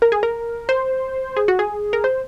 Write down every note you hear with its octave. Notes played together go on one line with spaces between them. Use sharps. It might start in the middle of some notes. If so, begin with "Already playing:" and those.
A#4
G#4
A#4
C5
G#4
F#4
G#4
A#4
C5